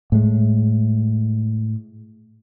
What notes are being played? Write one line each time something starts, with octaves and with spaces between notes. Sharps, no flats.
A2 G#3